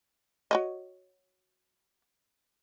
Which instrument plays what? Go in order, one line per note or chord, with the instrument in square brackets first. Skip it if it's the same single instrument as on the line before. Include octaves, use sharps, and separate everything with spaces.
[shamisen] F#4 C#5 D#5